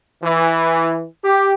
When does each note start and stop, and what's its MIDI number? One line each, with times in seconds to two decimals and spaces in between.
0.24 1.04 52
1.24 1.54 67